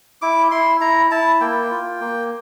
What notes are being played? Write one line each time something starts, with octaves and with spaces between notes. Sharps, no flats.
E4 D6
E4 C6
E4 A#5
E4 A5
A#3 G5
F4
A#3